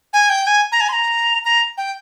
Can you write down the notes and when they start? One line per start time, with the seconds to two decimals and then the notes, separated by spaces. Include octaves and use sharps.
0.13 G#5
0.30 G5
0.47 G#5
0.72 A#5
0.81 G#5
0.89 C6
0.93 A#5
1.45 A#5
1.78 G5